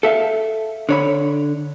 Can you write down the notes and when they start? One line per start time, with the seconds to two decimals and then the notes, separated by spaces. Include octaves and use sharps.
0.03 A4 E5 F5
0.89 D3 C#5 B5